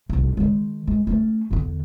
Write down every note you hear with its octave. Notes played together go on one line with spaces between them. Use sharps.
F1 C2
D#3 G#3
G#3
A3 C#4
E2 D3